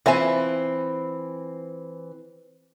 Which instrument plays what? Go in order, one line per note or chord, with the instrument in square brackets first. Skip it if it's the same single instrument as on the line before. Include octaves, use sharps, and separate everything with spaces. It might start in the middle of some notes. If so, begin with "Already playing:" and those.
[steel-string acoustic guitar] E3 C4 [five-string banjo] F4 E5 G#5